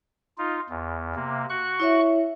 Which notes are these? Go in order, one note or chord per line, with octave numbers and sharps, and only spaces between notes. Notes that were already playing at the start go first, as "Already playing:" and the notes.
D#4 F4
E2
C3 A#3
F#4 C#6 F#6
E4 C#5 E5